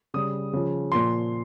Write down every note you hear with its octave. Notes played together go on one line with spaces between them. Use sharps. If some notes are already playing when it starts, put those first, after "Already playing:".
C#3 G3 D#6
C#3 F3
A#2 F3 C6